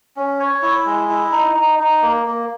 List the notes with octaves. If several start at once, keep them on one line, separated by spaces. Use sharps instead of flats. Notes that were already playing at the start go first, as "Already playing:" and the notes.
C#4
C#5
E4
G#3
E4
D#4
D#4
D#4
A#3
A#3